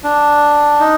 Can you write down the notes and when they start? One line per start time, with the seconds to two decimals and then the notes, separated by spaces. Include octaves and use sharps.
0.04 D4
0.80 D#4